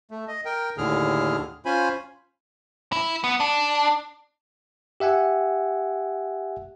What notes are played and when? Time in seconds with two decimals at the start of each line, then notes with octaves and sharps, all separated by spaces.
0.11 A3
0.28 D#5
0.45 A#4 G5
0.78 D#2 A2 D3 G#4 F6
1.65 C#4 F4 C5 G#5 B5
2.92 E4
3.24 B3
3.40 D4
5.00 G4 E5 F#5 G#5